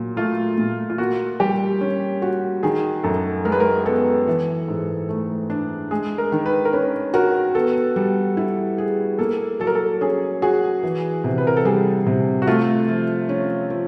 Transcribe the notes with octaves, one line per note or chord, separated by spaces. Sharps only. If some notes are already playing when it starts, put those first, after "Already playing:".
Already playing: A#2 F#3
A3 F4
A#2
F4
A#3 F#4
G3 G4
C#4
F#4
D#3 G#4
F#2 A4
G#3 A#4
B4
A#4
B3 A4
E3
G#2
A3
D4
G#3 G#4
A#4
D#3
B4
A#4
C#4 B4
F#4 A#4
B3 A4
G3
E4
G#4
A#3 A4
F#3 A4
A#4
A4
C#4 G#4
F#4 G#4
E3
C3
B4
A#4
A4
G3 G#4
C3
F#4
A3 F4
F3
C#4
F3